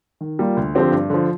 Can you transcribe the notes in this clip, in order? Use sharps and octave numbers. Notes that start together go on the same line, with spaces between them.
D#3
G3 A#3 F4
D2
D3 F3 C4 G4
G2
D3 F3